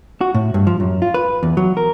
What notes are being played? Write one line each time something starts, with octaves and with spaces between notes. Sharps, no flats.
F#4
A2
G2
F3
F#2
F4
B4
E2
F#3
A#4